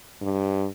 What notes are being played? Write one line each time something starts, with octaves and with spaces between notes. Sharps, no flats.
G2